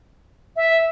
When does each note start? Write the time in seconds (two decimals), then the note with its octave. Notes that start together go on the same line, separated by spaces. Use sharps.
0.56 E5